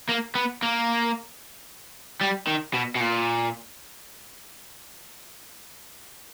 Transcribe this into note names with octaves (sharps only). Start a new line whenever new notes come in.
A#3
B3
A#3
G3
D#3
B2
B2
A#2